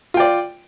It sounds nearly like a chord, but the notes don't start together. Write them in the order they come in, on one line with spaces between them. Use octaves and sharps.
F4 G5 D5